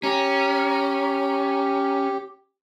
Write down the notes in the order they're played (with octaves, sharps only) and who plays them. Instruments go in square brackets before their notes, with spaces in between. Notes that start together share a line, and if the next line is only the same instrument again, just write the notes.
[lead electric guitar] C#4 [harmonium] G4 [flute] A#5